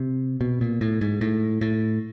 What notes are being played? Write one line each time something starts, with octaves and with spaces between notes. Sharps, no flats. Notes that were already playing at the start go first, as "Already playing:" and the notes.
Already playing: C3
B2
A#2
A2
G#2
A2
A2